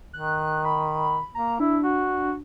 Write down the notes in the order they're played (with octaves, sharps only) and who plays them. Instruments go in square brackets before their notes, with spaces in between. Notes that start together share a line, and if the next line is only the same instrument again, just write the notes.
[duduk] D#3 [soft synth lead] F#6
[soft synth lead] B5
[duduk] A#3 [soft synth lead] A#5
[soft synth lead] D4 [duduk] E4
[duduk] F#4